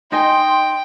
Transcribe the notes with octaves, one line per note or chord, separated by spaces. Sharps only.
D#4 D#5 G5 G#5 C6